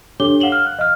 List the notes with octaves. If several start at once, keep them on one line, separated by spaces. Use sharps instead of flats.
D4 G4 A4 C#5 D6 G7
F5 F#5 E7 F#7 G7
F6
F#6
D#5 F5 F6